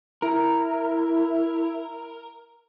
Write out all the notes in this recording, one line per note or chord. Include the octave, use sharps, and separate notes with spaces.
E4 A#4